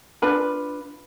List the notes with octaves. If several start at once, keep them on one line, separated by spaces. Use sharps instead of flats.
D4 F4 B4 B5